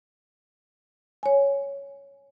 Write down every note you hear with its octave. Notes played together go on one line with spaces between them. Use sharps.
C#5 G#5